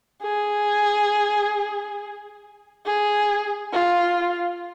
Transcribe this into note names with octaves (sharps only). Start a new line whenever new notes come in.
G#4
G#4
F4